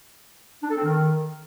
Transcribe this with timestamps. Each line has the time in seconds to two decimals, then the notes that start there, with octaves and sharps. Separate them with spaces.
0.62 D4
0.69 A4
0.76 C4
0.83 D#3